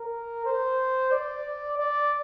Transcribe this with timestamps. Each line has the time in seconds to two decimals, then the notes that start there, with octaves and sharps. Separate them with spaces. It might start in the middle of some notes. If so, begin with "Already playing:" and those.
Already playing: A#4
0.46 C5
1.12 D5
1.78 D5